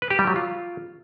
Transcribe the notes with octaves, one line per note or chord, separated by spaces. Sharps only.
B4
G4
G3
F#3
F4